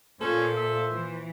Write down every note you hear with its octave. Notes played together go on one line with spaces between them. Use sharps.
A#2 C#4 A4 C5
E5
E3